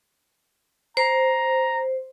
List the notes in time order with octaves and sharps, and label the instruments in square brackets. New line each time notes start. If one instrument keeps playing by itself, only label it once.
[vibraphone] C5 [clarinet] A#5